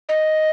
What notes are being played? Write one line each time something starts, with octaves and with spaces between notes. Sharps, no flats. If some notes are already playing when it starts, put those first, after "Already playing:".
D#5